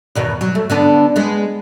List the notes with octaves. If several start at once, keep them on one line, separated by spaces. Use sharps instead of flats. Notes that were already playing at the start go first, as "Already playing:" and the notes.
E2 B2 D#3
F#3
A3
D3 B3 D4
G#3 B3